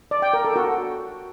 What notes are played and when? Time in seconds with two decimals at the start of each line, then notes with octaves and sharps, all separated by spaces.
0.11 D5
0.22 G5
0.33 A#4
0.45 A4
0.56 F#4